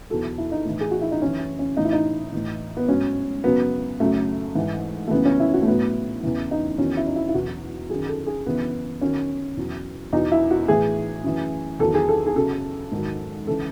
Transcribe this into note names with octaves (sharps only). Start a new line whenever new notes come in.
E2 B2 F#3 A4
E4
D#4
A2 E3
G#4
F#4
E4
D#4
F#2 E3 C#4
C#4
A2 E3 D#4
E4
D#4
A2 E3
B3
G#2 F#3 C#4
F#2 C#3 F#3 B3
F#2 C#3 F#3 A3
G#2 E3
A3
F#2 C#3 E3 B3
C#4
E4
F#4
A3
A2 F#3 B3
E2 C#3 E3
D#4
E2 D#3 F#3 C#4
E4
D#4
E4
E4
E2 B2 F#3 F#4
F#2 D#3 F#3 G#4
A4
G#4
F#2 C#3 E3 B3
F#2 D#3 F#3 C#4
E2 B2 F#3
E2 B2 F#3 D#4
E4
F#4
A2 E3 G#4
F#2 E3
E2 D#3 F#3 A4
G#4
A4
G#4
F#2 C#3 F#3 A4
G#2 D#3 F#3
C#3 E3 A4